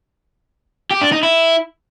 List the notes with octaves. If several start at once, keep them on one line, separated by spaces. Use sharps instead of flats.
G4
D4
D#4
E4